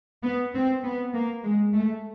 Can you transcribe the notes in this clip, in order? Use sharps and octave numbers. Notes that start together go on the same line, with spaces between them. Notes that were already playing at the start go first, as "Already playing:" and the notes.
B3
C4
B3
A#3
G#3
A3